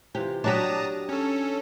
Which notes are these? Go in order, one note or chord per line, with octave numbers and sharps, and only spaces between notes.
C3 E3 F4 G4
F#3 D4 F#4 G4 A5 A#5 D#6
C#4 A4 C#5